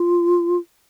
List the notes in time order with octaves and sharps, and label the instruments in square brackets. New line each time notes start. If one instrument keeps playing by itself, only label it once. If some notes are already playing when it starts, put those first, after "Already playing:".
Already playing: [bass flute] F4